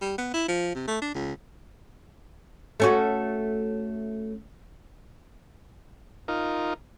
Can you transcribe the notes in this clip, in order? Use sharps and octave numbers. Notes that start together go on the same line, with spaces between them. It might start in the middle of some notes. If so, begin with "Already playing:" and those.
G3
B3
E4
F3
C3
A3
D4
C#2
A3 C#4 F#4
D#4 F4 A#4